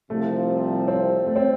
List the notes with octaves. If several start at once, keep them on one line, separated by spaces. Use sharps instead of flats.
C2 C3 F3 A3
C4
A3
C4